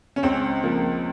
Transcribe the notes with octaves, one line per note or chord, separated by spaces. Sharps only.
C#4
C#2 C4
F3 A#3